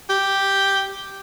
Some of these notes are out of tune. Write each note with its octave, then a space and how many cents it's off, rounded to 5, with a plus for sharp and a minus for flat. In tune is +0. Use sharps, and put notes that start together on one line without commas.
G4 +0